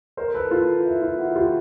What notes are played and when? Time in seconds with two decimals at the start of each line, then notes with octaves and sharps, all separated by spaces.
0.17 A#4 C5
0.34 A4 B4
0.51 F4
0.85 E4
1.02 F4
1.18 E4 F#4
1.35 F4 G4